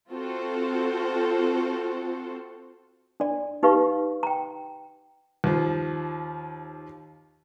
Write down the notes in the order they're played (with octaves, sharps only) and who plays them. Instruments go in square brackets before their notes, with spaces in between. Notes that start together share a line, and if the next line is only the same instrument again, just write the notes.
[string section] C4 F4 F#4 A4 C5
[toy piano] D4 D5
D#4 G4 B4 F5 C#6
G5 A#5
[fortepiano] D#2 F3